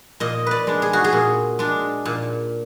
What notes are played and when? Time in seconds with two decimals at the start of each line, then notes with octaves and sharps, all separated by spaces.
0.20 A#2 D#5
0.46 B4 D5
0.67 G#3 D4
0.82 G#4
0.93 F#4
1.04 G#4
1.13 A#2
1.59 G#3 D4
2.05 A#2